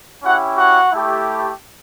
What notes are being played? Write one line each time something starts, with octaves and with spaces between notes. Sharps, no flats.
C#4 E4 F#4 G4 F#5
F#4 F#5
A3 E4 G4